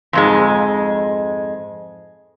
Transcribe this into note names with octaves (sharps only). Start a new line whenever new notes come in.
F2 G#2 G#3